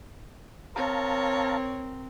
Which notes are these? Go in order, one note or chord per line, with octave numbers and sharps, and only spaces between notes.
C4 A#4 C#5 F5 A5 A#5